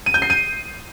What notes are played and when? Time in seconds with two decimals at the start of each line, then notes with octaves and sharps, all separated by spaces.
0.06 D#7
0.14 G6
0.22 C7
0.30 D#7